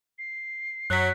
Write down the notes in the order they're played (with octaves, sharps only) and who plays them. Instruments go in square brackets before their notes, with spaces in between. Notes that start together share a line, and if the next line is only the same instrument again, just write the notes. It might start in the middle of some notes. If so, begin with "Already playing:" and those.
[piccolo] C7
[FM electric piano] F#2 [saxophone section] F#3 [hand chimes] F#6 B6